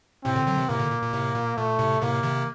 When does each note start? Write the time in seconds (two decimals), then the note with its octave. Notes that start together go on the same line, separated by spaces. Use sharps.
0.24 A2 C3 C4
0.35 A#2 D3
0.47 D3 F#3
0.57 C3 D#3
0.69 A2 C3 A#3
0.79 A#2 D3
0.91 A#2
1.02 A#2
1.13 A2 C3
1.35 A#2
1.57 A#2 A3
1.79 A2 C3
2.01 A2 C3 A#3
2.23 C3 D#3